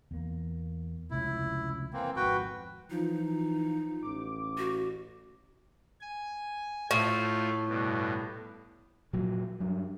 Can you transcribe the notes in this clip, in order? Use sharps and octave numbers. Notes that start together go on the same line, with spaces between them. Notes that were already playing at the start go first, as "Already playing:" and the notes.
E2 A#3
F1 C#2 C#4 E4
E3 A#3 C4
G#1 F2 F#4 B4 G5
E3 F3 D#4
A1 D6
F#4
G#5
A2 A3 F4
G2 B2
A#2 F3 F#3
G2 F#3